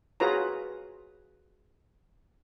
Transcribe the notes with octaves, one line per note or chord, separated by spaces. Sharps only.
F4 F#4 G#4 B4 C#5 A#5